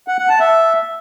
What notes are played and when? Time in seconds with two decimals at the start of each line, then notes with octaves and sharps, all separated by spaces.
0.08 F#5
0.19 F#5
0.29 A5
0.40 E5